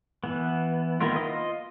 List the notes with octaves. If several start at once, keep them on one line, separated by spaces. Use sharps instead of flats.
E3 B3
D#3 A#3 B3 E4 F4
F4 D#5